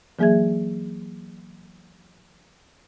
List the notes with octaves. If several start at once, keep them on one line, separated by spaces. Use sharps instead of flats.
E3 F#3 A#3 G#4 E5 G#6